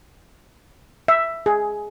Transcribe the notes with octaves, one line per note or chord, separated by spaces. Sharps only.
E5
G#4